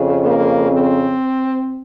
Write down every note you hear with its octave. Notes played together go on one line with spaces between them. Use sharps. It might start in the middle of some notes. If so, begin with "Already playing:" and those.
Already playing: F2 C#3
A#3
C4